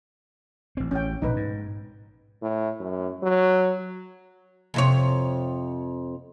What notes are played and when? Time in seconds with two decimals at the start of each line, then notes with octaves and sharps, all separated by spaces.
0.77 A1 C4
0.91 A1 C#4 G5
1.22 A#1 B2 D#4 B4
1.36 G#2
2.42 A2
2.80 F#2
3.23 F#3
4.74 F2 C3 C#5